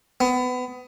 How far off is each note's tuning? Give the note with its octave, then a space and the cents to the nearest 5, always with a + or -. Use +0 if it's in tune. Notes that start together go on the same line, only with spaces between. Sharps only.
B3 +25